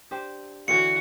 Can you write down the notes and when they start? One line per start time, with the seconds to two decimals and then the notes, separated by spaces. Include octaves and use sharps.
0.11 D4 G4 C5
0.68 D3 E3 F#4 C#5 C#7